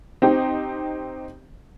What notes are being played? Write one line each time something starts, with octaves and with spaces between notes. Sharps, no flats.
C4 D#4 G4